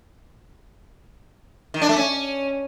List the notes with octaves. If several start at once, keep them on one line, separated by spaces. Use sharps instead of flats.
D#3
D4
A3
C#4